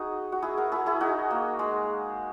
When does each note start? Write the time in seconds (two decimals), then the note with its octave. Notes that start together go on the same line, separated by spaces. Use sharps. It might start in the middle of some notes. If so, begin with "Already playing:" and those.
Already playing: D#4 F#4 G#4
0.32 F#4
0.42 E4 G#4
0.57 F#4 A#4
0.72 E4 G#4
0.86 E4 G#4
1.01 D#4 F#4
1.31 A#3
1.59 G#3